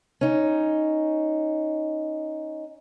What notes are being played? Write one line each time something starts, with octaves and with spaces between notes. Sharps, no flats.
C#4 D#4